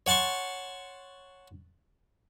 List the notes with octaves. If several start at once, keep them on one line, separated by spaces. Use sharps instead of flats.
C#5 F#5 A5 C6 C#6